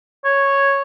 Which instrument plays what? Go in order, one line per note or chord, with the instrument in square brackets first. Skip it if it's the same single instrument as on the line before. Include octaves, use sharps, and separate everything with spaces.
[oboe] C#5